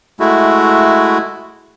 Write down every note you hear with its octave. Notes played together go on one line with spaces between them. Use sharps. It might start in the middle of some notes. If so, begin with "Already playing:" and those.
G#3 A3 E4 F#4